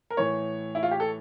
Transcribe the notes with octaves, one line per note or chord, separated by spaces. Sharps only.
A#4
A2 E3 C#5
E4
F4
G4
A4